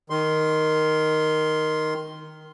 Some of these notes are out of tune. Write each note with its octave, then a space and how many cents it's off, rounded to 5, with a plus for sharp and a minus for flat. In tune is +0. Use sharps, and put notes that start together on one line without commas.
D#3 +0 C6 +0